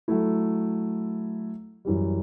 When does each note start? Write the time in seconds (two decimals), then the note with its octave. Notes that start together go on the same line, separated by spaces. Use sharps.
0.08 F#3 A3 E4
1.85 F#2 E3 G3